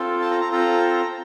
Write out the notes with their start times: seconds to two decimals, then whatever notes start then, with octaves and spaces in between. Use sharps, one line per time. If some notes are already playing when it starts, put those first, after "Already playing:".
Already playing: C4 F4 A4
0.21 A5
0.31 A#5
0.41 A#5
0.51 C4 F4 A4 A#5